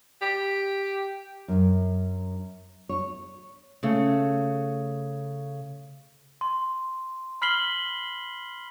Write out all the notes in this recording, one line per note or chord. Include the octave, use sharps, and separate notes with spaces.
G4
F#2
C#5
C#3 A3
C6
B5 F6 B6 C7 F#7 G7